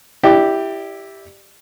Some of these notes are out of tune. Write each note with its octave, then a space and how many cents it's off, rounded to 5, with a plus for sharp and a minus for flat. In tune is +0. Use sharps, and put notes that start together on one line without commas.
E4 +0 G4 +0 D5 +30